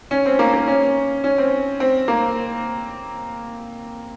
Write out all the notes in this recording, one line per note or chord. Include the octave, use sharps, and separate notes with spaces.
C#4
C4
A#3
A#3
C#4
C#4
C4
C4
A#3